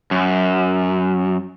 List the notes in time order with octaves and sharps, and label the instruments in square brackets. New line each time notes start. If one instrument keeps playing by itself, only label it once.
[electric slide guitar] F#2